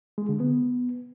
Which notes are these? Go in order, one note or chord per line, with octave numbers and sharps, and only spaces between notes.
G#3
D3
B3